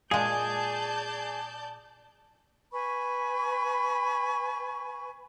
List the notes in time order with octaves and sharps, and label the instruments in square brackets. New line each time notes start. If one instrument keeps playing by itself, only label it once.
[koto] A#2 G#3 [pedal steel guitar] G#4 G#5 [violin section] D5 A5 G6
[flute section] B4 G#5 B5 C#6